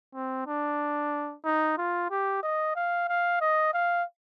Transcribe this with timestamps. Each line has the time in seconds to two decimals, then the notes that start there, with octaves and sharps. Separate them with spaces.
0.15 C4
0.47 D4
1.45 D#4
1.78 F4
2.10 G4
2.43 D#5
2.76 F5
3.08 F5
3.41 D#5
3.74 F5